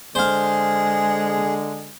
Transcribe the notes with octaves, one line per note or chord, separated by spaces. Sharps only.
D3 G#3 G#4 C5 F5